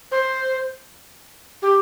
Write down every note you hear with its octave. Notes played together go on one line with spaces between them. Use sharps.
C5
G4